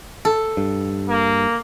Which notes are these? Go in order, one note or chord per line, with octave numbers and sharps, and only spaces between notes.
A4
G2
A#3